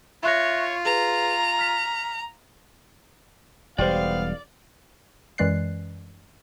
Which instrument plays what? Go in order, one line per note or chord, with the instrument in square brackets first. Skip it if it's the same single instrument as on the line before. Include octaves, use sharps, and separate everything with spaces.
[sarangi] F4 [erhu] C#5 [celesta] E5 F#6 A#6
[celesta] G#4 B4 [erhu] A#5
[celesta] F6 B6
[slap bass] E1 G3 [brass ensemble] B1 B3 F5 [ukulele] G4 C5 [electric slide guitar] D5
[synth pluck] F#2 E3 G#3 D5 F#6 C7